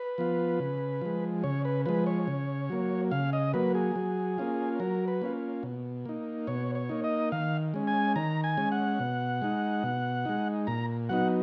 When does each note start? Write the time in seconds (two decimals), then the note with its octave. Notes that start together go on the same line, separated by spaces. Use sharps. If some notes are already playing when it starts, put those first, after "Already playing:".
Already playing: B4
0.18 F3 B3 F4
0.60 C#3
1.01 F3 G#3
1.43 C#3 C#5
1.65 B4
1.86 F3 G#3 B4
2.06 C#5
2.28 C#3
2.70 F#3 A#3
3.11 C#3 F5
3.33 D#5
3.53 F#3 A#3 B4
3.75 G#4
3.96 F#3
4.38 A#3 C#4 F4
4.80 F#3 A#4
5.08 B4
5.22 A#3 C#4 F4
5.63 B2
6.05 A#3 D#4
6.47 B2 C#5
6.75 C#5
6.89 A#3 D#4
7.04 D#5
7.32 D#3 F5
7.74 G#3 C#4
7.87 G#5
8.16 D#3 A#5
8.44 G#5
8.58 G#3 C#4
8.72 F#5
9.00 B2
9.42 G#3 D#4
9.83 B2
10.25 G#3 D#4
10.67 A#2 A#5
11.09 F#3 B3 D#4 F#5